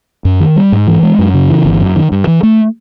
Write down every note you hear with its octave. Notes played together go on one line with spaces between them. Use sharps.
F#2
D#3
G3
G#2
E3
G#3
F#2
C#3
E3
G1
F#2
D#3
G2
E3
A3